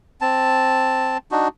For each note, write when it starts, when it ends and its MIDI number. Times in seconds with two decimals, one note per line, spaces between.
0.21 1.18 60
0.21 1.18 81
1.31 1.48 62
1.31 1.48 63
1.31 1.48 66